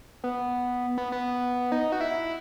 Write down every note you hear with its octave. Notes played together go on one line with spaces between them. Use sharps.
B3
B3
B3
D#4
F#4
E4